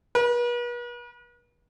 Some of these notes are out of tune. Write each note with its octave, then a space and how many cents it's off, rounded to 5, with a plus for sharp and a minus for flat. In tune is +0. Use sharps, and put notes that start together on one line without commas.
B4 -40